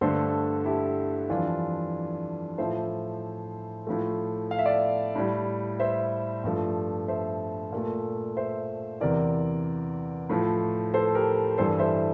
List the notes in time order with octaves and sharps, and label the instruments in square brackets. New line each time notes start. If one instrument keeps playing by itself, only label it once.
[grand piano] G2 D3 A3 A4 C5
E4 G4
F2 E3 G3 D4 F4
A2 F3 A3 C5 E5
A2 F3 A3
F5
E5
D5 F5
A2 G3
C5 E5
G2 F3 A3
C5 E5
A#2 A3
C5 E5
E2 C3 E3 A#4 D5
A2 F3 A3
A4 C5
G4 A#4
G2 E3 G3 A4 C5
C5 E5